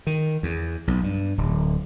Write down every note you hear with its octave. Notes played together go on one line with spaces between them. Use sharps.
D#3
E2
B1
G2
D1